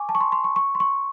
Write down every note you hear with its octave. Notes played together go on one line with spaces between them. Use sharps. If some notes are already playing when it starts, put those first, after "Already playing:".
Already playing: G#5 C#6 D6
A5
C#6
C6
C6
C#6
C#6
C6
C#6